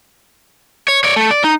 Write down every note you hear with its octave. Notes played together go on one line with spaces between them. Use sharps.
C#5
C#5 D5
A3
D5
D#4